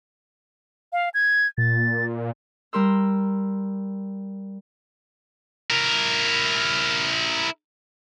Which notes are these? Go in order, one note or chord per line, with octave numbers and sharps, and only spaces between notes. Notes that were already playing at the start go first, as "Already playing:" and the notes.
F5
G#6
A#2 A6
G3 A#4 C6 E6
E4 A#4